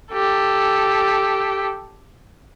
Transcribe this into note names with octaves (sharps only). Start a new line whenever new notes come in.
G4 A4